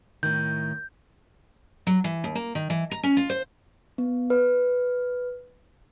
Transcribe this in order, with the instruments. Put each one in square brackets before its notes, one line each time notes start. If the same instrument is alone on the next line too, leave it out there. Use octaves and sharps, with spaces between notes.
[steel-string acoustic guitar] A2 D#3 [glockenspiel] G6
[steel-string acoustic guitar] F#3
E3
D#2
A#3
D#3
E3
A#5
C#4
F4
C5
[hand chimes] B3
B4